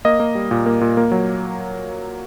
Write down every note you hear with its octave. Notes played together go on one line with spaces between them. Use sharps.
A#3 D#5
A#3
G3
A#2
A#3
A#2
A#3
F#3